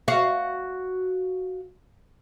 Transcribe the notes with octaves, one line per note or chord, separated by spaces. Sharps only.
F#4 F5